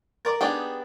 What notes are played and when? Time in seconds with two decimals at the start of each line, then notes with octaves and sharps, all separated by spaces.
0.25 A#4 D5
0.41 B3 D4 D#4 G4 G#4